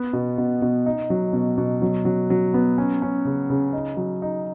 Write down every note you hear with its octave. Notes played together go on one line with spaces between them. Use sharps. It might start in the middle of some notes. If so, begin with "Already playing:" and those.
Already playing: B3
B2
B2
B2
D#4
F#3
B2
B2
F#3
F#3
F#3
B3
C#4
C#4
C#3
C#3
D#4
F#3
D#4